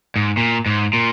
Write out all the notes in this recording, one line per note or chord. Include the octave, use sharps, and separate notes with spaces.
G#2
A#2
G#2
A#2